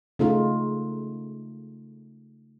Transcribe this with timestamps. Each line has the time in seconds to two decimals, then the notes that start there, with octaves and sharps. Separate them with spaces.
0.19 C#3 A3 D#4 F4